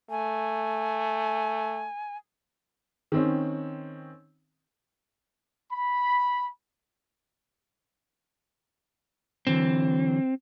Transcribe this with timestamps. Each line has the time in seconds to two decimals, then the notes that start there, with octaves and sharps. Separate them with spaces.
0.10 A3 G#5
3.12 D#3 C4 C#4
5.72 B5
9.47 D3 E3 F#3 C4